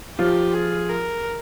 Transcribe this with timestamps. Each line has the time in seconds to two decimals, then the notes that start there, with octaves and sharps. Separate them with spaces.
0.18 F3 F4 G4
0.54 G#4
0.89 A#4